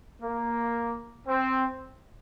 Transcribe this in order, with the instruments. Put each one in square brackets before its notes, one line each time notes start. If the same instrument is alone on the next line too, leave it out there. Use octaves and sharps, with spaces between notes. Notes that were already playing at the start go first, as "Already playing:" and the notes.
[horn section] A#3
C4